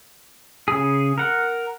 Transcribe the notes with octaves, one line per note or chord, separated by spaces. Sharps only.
C#3 G#4
A#4 F#5